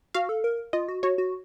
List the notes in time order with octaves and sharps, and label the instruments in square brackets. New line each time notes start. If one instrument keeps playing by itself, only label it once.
[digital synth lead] F#4 [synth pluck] F5
[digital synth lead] A4
A#4
[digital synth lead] F4 [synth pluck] D#5
[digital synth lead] F#4
[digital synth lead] F#4 [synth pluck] C#5
[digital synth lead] F#4